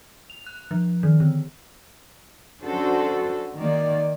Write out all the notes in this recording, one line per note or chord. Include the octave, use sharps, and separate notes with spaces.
F7
F#6
F3
D#3
D3
C#4 D4 F#4 A4 C5
D#3 A#3 D5